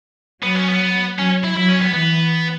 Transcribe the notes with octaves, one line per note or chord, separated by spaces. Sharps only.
F#3 B3
C#4
B3
F#3 C#4
E4
F#3 E4
C#4
B3
E3 B3